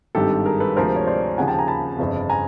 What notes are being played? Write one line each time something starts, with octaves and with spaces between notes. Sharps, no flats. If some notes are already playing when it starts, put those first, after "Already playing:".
G#1 G2 D#3 G4 A4
G#4 A#4
A4 B4
D2 C3 F3 G#3 A#4 C5
C#5
C5 D5
D#2 C#3 F3 F#5 G#5
G5 A5
G#5 A#5
A5 B5
G1 F2 C#3
G#5 A#5